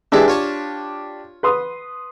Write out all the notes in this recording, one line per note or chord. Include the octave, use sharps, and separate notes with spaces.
E3 G#3 D4 E4 G4
F4 C#5 A5
B4 C6 D#6